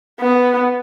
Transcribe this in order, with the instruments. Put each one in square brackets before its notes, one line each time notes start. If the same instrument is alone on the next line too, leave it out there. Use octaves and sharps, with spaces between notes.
[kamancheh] B3